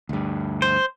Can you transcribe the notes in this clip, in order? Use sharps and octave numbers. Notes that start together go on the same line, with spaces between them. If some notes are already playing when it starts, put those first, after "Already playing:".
D2 G2
C5